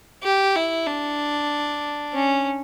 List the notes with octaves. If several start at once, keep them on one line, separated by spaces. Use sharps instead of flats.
G4
E4
D4
C#4